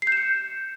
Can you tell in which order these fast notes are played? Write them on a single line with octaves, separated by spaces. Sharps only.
C7 G6 E7 C#7